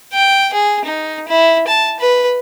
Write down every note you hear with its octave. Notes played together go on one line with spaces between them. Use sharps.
G5
G#4
D#4
E4
A5
B4